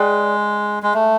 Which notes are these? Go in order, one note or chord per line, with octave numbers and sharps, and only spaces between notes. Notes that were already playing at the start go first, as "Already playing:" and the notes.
Already playing: G#3 G#4 B4 D5 G5
G#3
A3